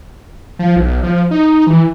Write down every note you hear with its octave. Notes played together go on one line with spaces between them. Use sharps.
F3
B1
F3
D#4
E3